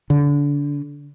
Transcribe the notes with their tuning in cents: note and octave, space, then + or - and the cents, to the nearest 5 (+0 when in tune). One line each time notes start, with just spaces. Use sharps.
D3 -30